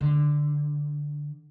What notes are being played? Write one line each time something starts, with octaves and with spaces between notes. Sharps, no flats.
D3